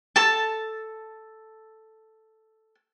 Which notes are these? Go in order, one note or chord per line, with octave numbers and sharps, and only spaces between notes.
A4 A5